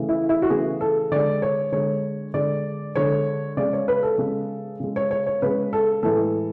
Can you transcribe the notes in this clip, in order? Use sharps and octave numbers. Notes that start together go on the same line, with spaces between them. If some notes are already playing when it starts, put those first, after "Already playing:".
Already playing: C#3 E3 A3
E4
E4
F#4
C#3 E3 A3 G#4
A4
D3 G#3 D5
C#5
D3 G#3 C#5
D3 G#3 D5
D3 G#3 C#5
C#3 G#3 D5
C#5
B4
A4
C#3 G#3
C#3 G#3
C#5
C#5
C#5
C#3 G#3 B4
A4
A2 E3 G#3 A4